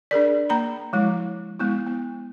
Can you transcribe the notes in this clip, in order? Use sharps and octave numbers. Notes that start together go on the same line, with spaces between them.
D4 G#4 A#4 D5
A#3 A#5 B5
F3 G#3 E4
G#3 B3 E4
B3